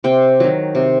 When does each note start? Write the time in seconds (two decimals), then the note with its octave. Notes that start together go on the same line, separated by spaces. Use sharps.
0.04 C3 G5
0.40 D#3 F#3
0.75 C3